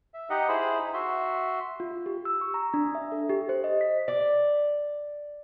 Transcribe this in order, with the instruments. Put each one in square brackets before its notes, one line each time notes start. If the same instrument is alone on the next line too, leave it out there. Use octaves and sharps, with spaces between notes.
[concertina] E5
D#4 G4 D#5 F#5
E4 G#4 C5 B5
D#4
F#4 E5 C6
[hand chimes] F4
G4
E6
C#6
A#5
D4
E5
A4
G4
C5
D#5
B6
[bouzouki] D5